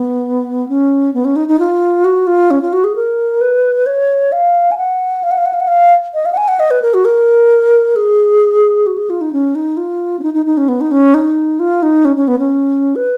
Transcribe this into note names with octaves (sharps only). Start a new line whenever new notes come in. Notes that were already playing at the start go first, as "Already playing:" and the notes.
Already playing: B3
C#4
B3
C#4
D#4
D#4
F4
F#4
F4
C#4
F4
F#4
G#4
A#4
B4
C#5
F5
G#5
F#5
F5
F#5
F5
F#5
F5
F#5
F5
D#5
F5
F#5
G#5
F#5
D#5
B4
A#4
F#4
A#4
G#4
F#4
G#4
F4
D#4
C#4
D#4
F4
C#4
D#4
D#4
D#4
C#4
B3
D#4
C#4
D#4
F4
D#4
C#4
C#4
B3
C#4
B4